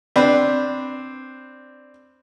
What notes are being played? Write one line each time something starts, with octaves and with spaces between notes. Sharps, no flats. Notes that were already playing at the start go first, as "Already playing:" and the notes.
C4 D4 B4